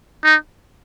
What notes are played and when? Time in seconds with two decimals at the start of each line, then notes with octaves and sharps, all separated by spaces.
0.24 D#4